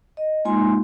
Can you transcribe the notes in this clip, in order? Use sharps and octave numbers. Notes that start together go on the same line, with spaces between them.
D#5
G#3 A#3 D#4 F4 G#5 C6